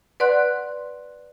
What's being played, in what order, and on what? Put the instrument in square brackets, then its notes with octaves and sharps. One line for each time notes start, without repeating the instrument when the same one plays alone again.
[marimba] B4 D5 F#5 C6 F#6